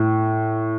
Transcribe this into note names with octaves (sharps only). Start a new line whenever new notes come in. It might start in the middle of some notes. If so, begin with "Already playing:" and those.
Already playing: A2